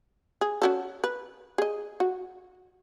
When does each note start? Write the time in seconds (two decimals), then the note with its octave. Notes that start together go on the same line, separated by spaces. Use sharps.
0.41 G#4
0.62 C#4 F#4 A4
1.04 B4
1.58 G#4 D#5
2.00 F#4